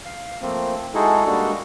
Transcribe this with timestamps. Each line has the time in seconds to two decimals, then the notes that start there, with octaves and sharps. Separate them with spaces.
0.05 F5
0.41 F3 A3 A#3 C4
0.94 G#3 D#4 E4 F#4 G#4 A4
1.26 G3 G#3 A#3 D4 F#4 A4